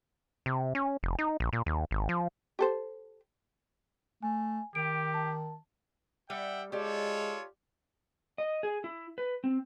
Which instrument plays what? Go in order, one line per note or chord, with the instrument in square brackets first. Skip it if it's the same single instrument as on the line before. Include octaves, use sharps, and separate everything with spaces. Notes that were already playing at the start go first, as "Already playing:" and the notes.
[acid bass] C3
C#4
F1
D#4
A#1
A#2
D#2
G#1
F3
[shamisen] G4 A4 C5
[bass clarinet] A3 [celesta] G#5
[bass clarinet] D#3 [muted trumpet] G4 [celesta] D7
[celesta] A5
[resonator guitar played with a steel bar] G3 [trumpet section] E5 F#5 G5
[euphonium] G#3 [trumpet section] F4 A4 C#5 [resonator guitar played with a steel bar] G4 D5
[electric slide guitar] D#5
G#4
E4
B4
C4